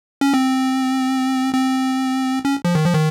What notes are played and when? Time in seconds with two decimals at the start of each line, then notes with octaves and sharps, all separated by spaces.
0.21 C#4
0.34 C4
1.54 C4
2.45 C#4
2.65 F3
2.75 D#3
2.85 F3
2.94 D#3